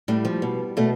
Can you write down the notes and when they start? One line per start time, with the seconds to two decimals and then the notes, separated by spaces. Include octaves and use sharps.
0.08 A2 G3
0.25 F3
0.42 B2
0.77 B2 A3